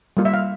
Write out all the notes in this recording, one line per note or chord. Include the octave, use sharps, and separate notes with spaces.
G3 A#3 F4
E5
F5